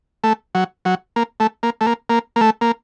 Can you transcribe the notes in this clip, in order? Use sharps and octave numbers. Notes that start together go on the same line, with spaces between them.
A3
F#3
F#3
A#3
A3
A#3
A3
A#3
A#3
A#3
A3
A#3